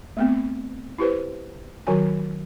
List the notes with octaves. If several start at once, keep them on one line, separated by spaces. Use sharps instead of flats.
A3 B3 C4
E4 G4 B4 C5
D#3 F#3 F#4 G#5